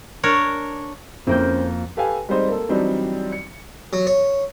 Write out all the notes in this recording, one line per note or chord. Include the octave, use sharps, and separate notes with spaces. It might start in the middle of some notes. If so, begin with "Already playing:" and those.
D4 A#4 C#5
F2 A#3 C4 C#4 E4 C5 G6
G4 A4 B4 F5 G5 G#5
G3 G#3 C4 D#4 C5 D#5
A#3 A4
E3 F#3 G3 C4 D4 D#4
C#7
F#3
C#5